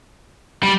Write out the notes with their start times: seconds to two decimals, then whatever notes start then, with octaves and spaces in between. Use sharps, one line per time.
0.63 G3